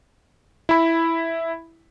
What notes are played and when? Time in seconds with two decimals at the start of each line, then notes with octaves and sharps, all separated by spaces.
0.69 E4 B5